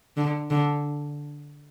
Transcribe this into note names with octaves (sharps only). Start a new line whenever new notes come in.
D3
D3